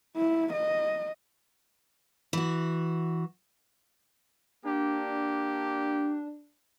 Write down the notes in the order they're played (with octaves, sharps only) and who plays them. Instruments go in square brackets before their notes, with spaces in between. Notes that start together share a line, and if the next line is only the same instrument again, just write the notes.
[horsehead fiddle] E4
D#5
[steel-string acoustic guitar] E3 F#4
[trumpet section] A#3 G4 [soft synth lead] D4